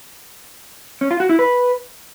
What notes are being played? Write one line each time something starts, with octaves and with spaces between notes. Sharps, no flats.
C#4
F4
F#4
E4
B4